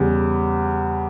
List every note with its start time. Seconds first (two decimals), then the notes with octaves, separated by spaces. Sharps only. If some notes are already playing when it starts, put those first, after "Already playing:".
Already playing: E2 C#3 G3